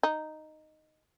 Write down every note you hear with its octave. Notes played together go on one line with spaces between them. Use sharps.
D#4